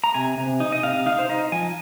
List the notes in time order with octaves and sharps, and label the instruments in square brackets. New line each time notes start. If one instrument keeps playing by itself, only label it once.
[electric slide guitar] A#5
C3 G#5
C3
D#4
D#5
C3 F5
D#4 F5
C5
D#4 D#5
F3 G#5